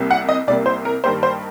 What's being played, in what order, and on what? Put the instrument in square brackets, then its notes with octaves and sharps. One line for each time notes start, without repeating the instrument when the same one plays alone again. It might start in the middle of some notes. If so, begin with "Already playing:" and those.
Already playing: [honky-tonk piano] C2 C3 G3 A#3
F#5
D#5
C2 C3 G3 A#3 D5
C5
A#4
G2 D#3 G3 A#3 C5
C5